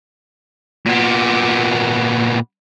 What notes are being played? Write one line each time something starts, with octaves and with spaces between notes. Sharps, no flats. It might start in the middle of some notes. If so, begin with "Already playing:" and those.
A#2 B3